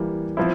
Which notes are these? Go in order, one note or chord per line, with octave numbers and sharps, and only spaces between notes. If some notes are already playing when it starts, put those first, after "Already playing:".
Already playing: E3 G3 A#3
F3 C4 E4